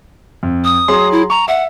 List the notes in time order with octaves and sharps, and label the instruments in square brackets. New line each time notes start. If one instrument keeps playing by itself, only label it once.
[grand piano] F2
[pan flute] D#6
[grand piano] F#3 G#4 C6
[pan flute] E4
[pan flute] A#5 [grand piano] C#6
[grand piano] E5 [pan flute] F#5